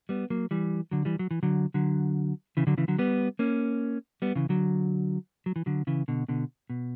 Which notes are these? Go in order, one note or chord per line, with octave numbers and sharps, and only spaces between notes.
G3 B3
F#3 A#3
E3 G3
D3 F#3
E3 G3
F#3
E3
D3 F#3
D3 F#3
C#3 E3
D3 F#3
C#3 E3
D3 F#3
G3 B3
A#3 C#4
G3 B3
C#3 E3
D3 F#3
F#3
E3
D3 F#3
C#3 E3
B2 D3
B2 D3
B2